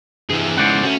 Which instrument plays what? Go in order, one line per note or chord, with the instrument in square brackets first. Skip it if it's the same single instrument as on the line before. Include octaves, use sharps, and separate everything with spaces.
[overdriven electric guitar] G2 E3 [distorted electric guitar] E4 G#4
[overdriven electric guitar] G#2 C#3 [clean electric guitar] C5 D5 F#5
[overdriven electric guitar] A3 F#4 [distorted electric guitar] C#4